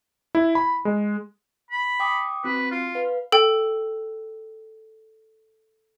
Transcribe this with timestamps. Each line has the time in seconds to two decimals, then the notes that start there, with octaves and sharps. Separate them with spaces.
0.35 E4
0.55 B5
0.85 G#3
1.71 B5
2.00 G5 D6 D#6
2.44 C4 F#4 B4
2.71 F4
2.95 B4 F5
3.32 A4 G5